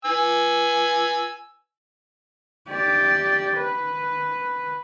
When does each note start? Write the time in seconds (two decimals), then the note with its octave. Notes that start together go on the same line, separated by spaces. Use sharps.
0.05 G#5 E6
2.69 G4 D5
3.58 B4